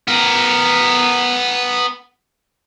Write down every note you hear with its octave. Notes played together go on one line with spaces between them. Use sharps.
B3 A#4